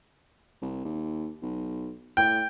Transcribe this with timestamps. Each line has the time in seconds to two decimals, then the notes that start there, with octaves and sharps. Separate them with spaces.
0.61 C2
0.85 D#2
1.42 B1
2.17 A2 G5